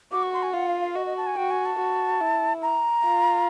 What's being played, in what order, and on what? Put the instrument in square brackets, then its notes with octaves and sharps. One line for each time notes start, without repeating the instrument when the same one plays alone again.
[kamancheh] F#4 [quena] D6
[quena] C#6
C6
G#5
[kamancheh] F4 [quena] F#5
[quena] F5
F5
[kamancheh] F#4 [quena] D#5
[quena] D#5
A5
G#5
[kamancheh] F#4 [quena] G5
[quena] G#5
A5
[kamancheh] F#4
E4
[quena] A#5
[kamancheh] F4